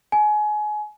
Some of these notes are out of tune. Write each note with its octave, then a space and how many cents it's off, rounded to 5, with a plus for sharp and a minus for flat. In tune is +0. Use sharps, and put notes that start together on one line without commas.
G#5 +25